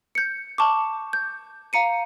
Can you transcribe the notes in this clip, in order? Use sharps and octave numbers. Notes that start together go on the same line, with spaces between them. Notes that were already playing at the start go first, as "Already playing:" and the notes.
G6 C#7
A5 C#6 D6
G6
F5 A#5 C#7 D#7